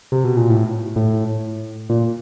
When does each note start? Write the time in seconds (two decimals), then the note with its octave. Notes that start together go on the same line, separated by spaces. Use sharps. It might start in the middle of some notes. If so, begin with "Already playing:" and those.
0.12 C3
0.24 B2
0.37 A#2
0.50 A2
0.96 A2
1.90 A#2